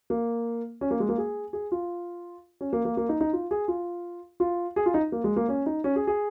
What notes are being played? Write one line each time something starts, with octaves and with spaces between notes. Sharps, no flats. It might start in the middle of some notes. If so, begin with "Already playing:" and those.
A#3
C#4
A#3
G#3
A#3
G#4
G#4
F4
C#4
A#3
A#3
A#3
D#4
D#4
F4
G#4
F4
F4
G#4
F4
D#4
A#3
G#3
A#3
C#4
D#4
C#4
G#4
G#4